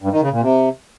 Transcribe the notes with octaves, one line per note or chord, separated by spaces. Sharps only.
G2
D#3
C#3
A#2
C3